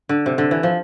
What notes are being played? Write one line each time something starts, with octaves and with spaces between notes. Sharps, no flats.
D3
C3
D3
E3
F3